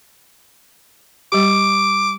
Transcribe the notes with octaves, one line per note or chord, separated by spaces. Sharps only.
G3 G4 D6